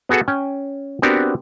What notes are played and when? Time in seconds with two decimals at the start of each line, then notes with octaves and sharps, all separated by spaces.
0.09 B3 F#4 G#4 A4 F#5
0.28 C#4 G5 G#5
1.02 B3 C4 D4 F#4 G4 A#4